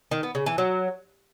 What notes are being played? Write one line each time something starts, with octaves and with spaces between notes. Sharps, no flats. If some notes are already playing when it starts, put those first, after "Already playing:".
D#3
B3
C#3
E3
F#3